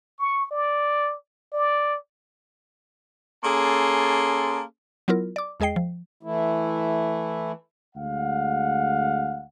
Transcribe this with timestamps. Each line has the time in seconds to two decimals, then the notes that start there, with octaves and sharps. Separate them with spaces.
0.19 C#6
0.51 D5
1.53 D5
3.45 A#3 C#4 G#4 A4 A5 C6
5.08 F#3 B3 E4 F4 A#4
5.36 D5 D6
5.60 E2 G#3 G#4 D#5 G5 C7
5.76 F3
6.23 E3 A3 E4
7.95 D2 G#3 F5 F#5